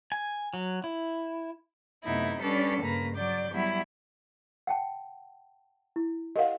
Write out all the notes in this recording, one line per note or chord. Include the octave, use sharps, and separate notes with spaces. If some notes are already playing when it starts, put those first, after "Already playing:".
G#5
F#3
E4
F#2 C3 A3 B3 D#4 E4
G3 C#4 D4 A4 B4 D5
G2 C#3 A#3 B4 A#5
F#3 D5 D6 G6
F#3 G3 B3 E4
F#5 G5 A5
E4
G4 A#4 D#5 F5 F#5